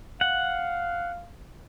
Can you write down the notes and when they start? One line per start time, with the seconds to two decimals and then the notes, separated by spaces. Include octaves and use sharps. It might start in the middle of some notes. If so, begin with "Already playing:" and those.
0.21 F5 F#5